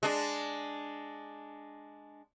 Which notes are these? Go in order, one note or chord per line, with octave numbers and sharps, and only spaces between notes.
G#3 D4